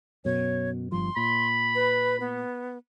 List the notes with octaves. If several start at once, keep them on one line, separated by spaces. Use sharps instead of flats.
F#2 B2 C#5
G1 G2 F3 C6
A#2 B5
B4
B3